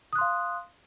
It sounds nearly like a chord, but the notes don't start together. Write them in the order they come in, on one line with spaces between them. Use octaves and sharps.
D#6 F#6 C6 F5